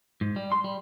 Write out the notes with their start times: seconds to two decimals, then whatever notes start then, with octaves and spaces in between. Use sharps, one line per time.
0.21 G#2
0.36 G3
0.52 C6
0.64 G3